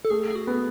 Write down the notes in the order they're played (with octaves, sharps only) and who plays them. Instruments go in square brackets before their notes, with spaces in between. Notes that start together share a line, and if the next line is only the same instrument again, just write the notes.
[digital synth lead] A4
[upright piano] A3 [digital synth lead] G#4
[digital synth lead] G#4
F#4
[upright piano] B3